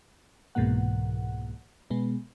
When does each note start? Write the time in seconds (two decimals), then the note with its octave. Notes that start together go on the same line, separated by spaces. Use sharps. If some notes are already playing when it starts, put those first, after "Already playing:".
0.55 C2 G#2 B2 E3 A#3 F#5
1.90 B2 G#3 B3